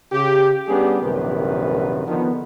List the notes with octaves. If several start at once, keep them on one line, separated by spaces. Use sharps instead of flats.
C#3 G4
G3 B3 C#4 D4 G4 G#4
A#1 F#2 C3 D#3 B4
D3 D#3 F3 B3